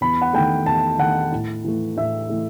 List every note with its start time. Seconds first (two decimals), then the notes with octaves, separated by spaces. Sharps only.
0.01 E2 B5
0.22 F#5
0.33 D#3 A3 G5
0.66 E2 A5
0.99 D#3 A3 F#5
1.32 A2
1.64 E3 A3
1.97 A2 E5
2.29 E3 A3